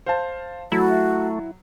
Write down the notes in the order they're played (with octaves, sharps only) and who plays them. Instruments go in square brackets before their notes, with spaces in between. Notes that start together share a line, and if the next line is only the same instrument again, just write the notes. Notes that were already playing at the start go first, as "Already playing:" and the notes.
[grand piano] C5 F5 A5
[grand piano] F#3 [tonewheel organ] A3 [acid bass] E4 [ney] F#4